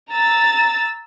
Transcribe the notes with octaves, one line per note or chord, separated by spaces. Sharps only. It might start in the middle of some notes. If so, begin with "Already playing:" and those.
A#5 E6 A6